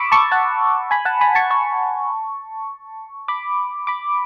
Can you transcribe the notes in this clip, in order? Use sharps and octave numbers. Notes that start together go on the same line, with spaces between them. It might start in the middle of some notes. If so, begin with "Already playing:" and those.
Already playing: B5 C#6 D6 E6
A5 C#6
F#5 A5
G#5 B5
F#5 A5
G#5 B5
A5 C#6
A5 C#6
B5 D6
B5 D6